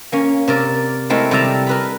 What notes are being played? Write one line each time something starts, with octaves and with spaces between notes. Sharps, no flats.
A#3 C#4
C3 A#4 D5
G#3 A3 C4 E4 A#4
C3 G3 G4 E5 A5 A#5
A#4 B4 B5